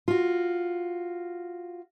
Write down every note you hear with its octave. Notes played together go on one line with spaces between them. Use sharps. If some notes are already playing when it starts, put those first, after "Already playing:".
F4 F#4